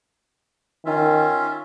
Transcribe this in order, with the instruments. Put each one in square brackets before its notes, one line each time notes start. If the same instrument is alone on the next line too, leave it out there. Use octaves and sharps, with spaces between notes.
[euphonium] D#3 [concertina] C#4 F4 E5